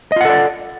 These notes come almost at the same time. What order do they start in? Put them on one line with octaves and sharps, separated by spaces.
D#5 F4 F#5 A4 D5